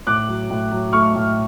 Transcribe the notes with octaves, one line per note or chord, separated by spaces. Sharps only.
A2 D6 F#6
F#3
A2
F#3
A3 C#6 F6
A2